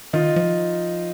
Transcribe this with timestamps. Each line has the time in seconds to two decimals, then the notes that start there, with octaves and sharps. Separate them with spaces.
0.13 D#3 D#4 F4
0.36 F3